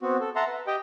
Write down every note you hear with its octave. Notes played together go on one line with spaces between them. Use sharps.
B3 C4 F#4
A4
E5 F#5 A5 A#5 C6
B4
G4 D#5 G5